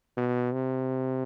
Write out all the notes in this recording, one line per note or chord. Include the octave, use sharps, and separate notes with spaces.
B2
C3